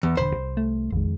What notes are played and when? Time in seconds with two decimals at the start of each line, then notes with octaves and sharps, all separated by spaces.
0.03 E2
0.17 E1 A#1 D3 C5 B5
0.35 C2
0.57 A3
0.93 A#1 F2 D#3 G#3